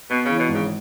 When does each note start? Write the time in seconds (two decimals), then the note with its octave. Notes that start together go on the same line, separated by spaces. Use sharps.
0.10 B2 B3
0.25 C#3 E3
0.39 B2
0.49 G#1
0.54 C#3